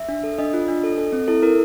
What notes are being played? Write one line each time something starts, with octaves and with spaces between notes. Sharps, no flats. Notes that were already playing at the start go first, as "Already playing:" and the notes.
Already playing: E5
D4
A4
D4 D#5
F4
D4
A4
A4
C4
E4 A4
E4 A#4